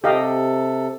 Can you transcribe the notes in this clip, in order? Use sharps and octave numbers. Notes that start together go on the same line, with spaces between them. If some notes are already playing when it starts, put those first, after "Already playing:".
C3 G4 A4 D#5 F5